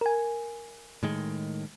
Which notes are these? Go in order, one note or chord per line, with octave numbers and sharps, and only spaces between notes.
A#4 G#5
A2 D#3 G#3